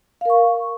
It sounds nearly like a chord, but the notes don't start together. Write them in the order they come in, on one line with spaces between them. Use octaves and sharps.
F5 A#4 C#6